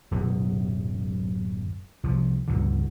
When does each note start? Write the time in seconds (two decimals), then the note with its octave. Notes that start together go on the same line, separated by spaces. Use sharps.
0.11 D1 F#2 B2
2.04 C2 F3
2.48 C#2 G2 D3